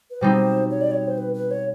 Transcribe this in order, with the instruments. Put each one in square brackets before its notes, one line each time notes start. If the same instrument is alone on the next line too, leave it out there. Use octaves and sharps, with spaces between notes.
[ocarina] B4
[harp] B2 G3 C4 D#4 [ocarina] C5
[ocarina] C#5
D5
C#5
C5
B4
B4
C#5